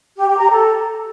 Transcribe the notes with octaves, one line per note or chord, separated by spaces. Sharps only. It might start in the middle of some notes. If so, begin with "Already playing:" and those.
G4
G4
A#5
A4